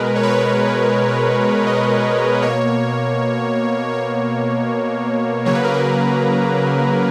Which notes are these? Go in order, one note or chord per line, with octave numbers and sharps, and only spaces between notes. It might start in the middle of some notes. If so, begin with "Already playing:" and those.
Already playing: B2 G#3 A#4 B4
C#5
B4
C#5
D#5
B2 A#3 C#5
C#5
C#3 F#3 A#3 C#5
B4
A#4
B4